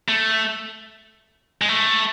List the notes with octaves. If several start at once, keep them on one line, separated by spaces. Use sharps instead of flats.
A3
G#3
A3